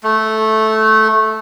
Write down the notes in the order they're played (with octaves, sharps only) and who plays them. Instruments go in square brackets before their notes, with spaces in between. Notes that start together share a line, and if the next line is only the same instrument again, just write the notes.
[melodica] A3